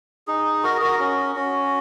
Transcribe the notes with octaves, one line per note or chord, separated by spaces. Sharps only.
D#4 G#4
F#4 A#4
G#4
F#4 A#4
C#4 F#4
C#4 F#4